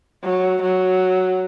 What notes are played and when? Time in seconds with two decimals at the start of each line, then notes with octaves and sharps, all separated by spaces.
0.24 F#3
0.62 F#3